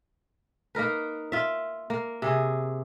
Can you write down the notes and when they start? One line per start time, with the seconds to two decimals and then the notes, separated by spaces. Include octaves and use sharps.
0.75 A#3 D#4 A#4 B4
1.32 F4 E5
1.90 A#3
2.22 C3 G#4